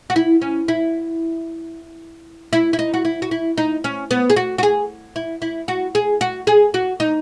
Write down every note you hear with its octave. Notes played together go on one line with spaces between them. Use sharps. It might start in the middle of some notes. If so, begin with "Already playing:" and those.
F#4
E4
C#4
E4
E4
E4
D#4
F#4
E4
F#4
E4
D#4
C#4
B3
G#4
F#4
F#4
G#4
E4
E4
F#4
G#4
F#4
G#4
F#4
D#4